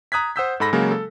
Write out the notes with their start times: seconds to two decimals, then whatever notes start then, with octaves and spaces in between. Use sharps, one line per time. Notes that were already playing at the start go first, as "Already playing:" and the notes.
0.12 A#5 D#6 F#6 G#6 B6
0.36 C5 F#5 D#6 E6 G6 B6
0.60 G#2 A4 B5 A#6
0.73 C#3 F#3 G#3 A#3
0.91 A4